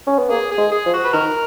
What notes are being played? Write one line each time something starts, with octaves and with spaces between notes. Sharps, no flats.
C#4
B3
A#3 G#4
G#4
G#3
G#4
F3
F#4
B4
D#3 F#4 A#4